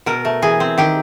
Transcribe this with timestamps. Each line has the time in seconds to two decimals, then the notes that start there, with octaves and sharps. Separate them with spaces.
0.06 B2 A#4
0.25 A3
0.42 E3 G#4
0.60 C4
0.78 D#3 G4